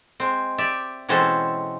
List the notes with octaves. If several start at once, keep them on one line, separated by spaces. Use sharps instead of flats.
G#3 C4
G4 D5 E5
B2 E3 G#3 C4 C#4 A4